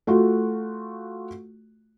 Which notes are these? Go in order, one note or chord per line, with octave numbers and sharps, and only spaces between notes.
A3 F4 F#4